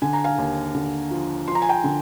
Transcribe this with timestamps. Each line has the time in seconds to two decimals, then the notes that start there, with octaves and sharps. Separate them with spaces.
0.02 D3 G#5
0.13 A#5
0.24 F5 G#5
0.38 D#2
0.75 D3
1.11 F3
1.48 F3 C6
1.55 A#5
1.62 G#5
1.69 G5 A#5
1.84 D3